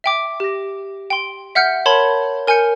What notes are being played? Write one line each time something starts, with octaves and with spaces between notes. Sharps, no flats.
E5 G5 D6
G4 A#6
G5 C6
E5 F#5 F6 G6 C#7
A#4 C#5 A5 B5 C6 G#6
A#4 G#5 F6 G6 C#7